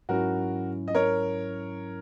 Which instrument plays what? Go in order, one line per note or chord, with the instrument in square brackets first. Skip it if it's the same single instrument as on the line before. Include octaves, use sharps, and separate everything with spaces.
[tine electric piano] G#2 F#3 C#4 E4 [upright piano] F#4 A#4
[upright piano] D#5
A#4 C#5